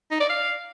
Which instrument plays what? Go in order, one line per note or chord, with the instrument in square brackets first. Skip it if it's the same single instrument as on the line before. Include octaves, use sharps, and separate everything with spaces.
[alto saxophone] D#4
D5
F5